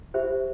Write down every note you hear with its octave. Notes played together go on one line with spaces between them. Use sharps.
G4 C5 E5